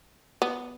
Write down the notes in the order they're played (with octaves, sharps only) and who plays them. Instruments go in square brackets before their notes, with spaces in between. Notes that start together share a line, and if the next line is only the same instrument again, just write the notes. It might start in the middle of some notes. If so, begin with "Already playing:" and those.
[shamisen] B3